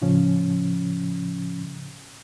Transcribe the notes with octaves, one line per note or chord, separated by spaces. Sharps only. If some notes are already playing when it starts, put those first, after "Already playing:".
A2 C#3 F3 C#4